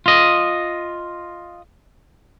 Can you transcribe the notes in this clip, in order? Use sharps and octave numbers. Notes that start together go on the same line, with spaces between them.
F4 D#5